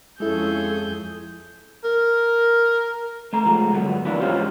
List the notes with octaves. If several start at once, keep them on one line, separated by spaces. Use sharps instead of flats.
F2 G#3 C#4 E4 G#4 A4 G6
A#4
A3 A#5
F3 G#3 A3
D2 G2 F#3 B3
E3 F#3 A#3 D4 B4
G#2 F3 C#4 F4 G4 C5